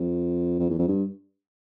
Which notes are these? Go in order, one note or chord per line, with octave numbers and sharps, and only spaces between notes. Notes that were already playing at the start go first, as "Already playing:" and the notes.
Already playing: F2
F2
E2
F2
G2